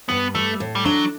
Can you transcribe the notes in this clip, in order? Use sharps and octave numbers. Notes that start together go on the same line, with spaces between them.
G2 B3
G3 A3
A2
G3
F#3 D4